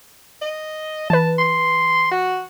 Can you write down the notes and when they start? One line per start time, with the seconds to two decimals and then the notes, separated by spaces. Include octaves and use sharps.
0.42 D#5
1.10 E3 B4 A5
1.39 C6
2.11 F#4